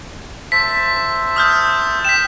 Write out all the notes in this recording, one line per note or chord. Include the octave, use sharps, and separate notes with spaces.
C5 E5 A5 B6
D#6 F6 G6
G5 B6 E7